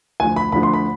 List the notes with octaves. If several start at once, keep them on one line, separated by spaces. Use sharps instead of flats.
D2 D3 F3 G#5
B5
D2 D3 F3 B5
C6
B5